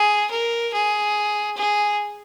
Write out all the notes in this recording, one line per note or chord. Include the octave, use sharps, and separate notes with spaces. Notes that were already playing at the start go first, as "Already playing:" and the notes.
Already playing: G#4
A#4
G#4
G#4